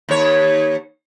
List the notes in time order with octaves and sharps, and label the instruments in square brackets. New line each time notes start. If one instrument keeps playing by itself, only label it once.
[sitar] D#2 C#5